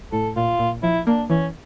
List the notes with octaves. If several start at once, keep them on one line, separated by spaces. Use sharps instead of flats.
A2 A4
A#2 F4
A#2
F3 E4
A#3 D4
E3 C#4